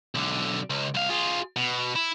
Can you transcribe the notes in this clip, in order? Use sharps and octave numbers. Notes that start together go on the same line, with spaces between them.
B1 D3
C#2
C2 F5
F4 G#4
B2
E4